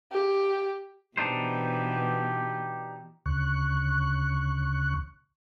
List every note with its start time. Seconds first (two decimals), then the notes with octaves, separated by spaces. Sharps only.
0.12 G4
1.17 B2 E3 B3 D4 D#4 G4 C5
3.26 D2 C#3 C#6 F#6